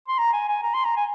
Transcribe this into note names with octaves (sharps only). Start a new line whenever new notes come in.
C6
A#5
G#5
G#5
A#5
C6
A#5
G#5